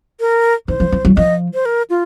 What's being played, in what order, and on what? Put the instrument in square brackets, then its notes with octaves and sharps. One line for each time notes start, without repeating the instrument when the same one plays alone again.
[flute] A#4
[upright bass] D#3 [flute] C5
[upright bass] F3
F3
F#3
[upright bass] F3 [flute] D#5
[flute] C5
A#4
F4